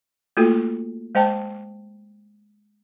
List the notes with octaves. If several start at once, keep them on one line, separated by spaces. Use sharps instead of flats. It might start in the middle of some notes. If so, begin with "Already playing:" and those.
A3 A#3 F4 F#4 A4
G#3 C5 D#5 G5 A5